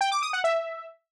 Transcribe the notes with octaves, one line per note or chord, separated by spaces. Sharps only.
G5
D6
D#6
F#5
E5